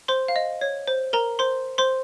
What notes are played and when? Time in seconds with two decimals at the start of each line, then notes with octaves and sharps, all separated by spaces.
0.08 C5 C6
0.28 F5
0.36 D#5
0.61 C#5
0.88 C5
1.13 A#4 A#5
1.39 C5 C6
1.78 C5 C6